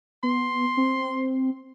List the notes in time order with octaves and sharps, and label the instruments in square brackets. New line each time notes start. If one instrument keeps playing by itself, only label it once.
[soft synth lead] B3 [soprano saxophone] C6
[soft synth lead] C4